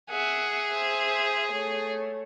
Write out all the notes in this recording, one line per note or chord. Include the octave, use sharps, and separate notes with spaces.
G#4 E5 F#5
C5 E5
A3 C#5